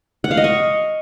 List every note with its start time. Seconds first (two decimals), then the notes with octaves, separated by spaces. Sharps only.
0.24 F#5
0.31 F5
0.37 D#5
0.44 C#6